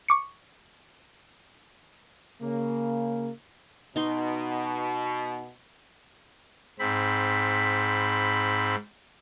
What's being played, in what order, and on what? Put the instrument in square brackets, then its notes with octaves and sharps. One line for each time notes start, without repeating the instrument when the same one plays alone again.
[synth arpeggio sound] C#6 D6 C#7
[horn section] C#3 A#3
[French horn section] B2 [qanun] D#4 C6
[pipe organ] G#2 C4 B5